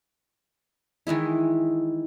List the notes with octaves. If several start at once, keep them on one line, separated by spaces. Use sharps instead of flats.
D#3 E3 G#3 E4